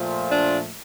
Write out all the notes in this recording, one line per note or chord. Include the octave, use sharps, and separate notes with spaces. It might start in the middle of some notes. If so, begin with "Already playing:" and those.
Already playing: A#2 F3 A3
D4 F4